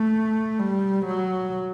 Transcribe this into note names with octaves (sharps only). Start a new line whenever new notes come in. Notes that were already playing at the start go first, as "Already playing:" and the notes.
Already playing: A3
G3
F#3